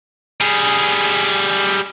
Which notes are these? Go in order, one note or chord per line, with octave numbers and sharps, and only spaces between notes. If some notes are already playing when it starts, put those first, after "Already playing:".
G3 G#4